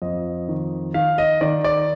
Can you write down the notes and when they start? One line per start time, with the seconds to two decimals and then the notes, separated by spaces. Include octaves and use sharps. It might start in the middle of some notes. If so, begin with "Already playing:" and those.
0.02 F2 D#5
0.48 D#3
0.94 D#3 F5
1.18 D#5
1.41 D#3 D5
1.64 D5